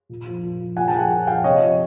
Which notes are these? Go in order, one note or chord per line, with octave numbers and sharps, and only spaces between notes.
A#2
F3
A#2
F3
A#2 F#5 G#5
G5 A5
F3
F#5 G#5
A#2
F3 F5 G5
C3 C#5 D#5
F3